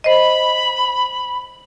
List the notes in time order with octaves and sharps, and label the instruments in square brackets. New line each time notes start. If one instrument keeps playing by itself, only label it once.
[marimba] C5 D#5 [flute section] B5